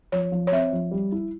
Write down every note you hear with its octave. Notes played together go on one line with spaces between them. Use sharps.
F3 C#5
F3
C#5
C4 E5
F3
G3
E4